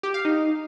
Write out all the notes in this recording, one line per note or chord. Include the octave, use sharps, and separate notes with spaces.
G4
F5
D#4